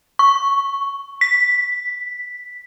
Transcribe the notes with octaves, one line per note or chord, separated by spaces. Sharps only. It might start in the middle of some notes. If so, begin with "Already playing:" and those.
C#6
B6